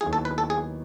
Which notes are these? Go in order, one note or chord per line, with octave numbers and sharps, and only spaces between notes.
D#2 D#3 F#3 B3 E4 G#4
A4
B4
A4
G#4